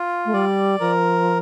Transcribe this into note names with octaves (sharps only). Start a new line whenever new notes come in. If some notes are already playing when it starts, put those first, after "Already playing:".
Already playing: F4
A3
G3 D5
F3 A#4